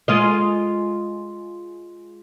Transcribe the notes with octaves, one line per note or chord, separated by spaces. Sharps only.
G#3 F4 D#5